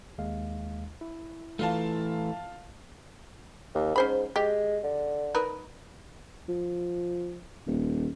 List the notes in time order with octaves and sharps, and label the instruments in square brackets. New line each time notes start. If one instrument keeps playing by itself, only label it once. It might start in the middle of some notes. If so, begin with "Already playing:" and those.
[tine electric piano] D#2 G#3 F5
E4
[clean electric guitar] E3 A3 [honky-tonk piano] F4 F5 A5
[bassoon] D#2
[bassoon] G#2 [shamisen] C#4 C5 B5
[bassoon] G#3 [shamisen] G4
[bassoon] D3
[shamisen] D#4 A#4 B4
[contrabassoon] F3
D#1